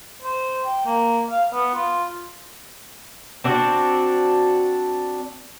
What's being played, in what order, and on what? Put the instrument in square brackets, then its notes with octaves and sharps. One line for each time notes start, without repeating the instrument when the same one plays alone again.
[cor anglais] C5
G5
A#3
F5
B3
F4
[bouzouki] C4 D4 F#4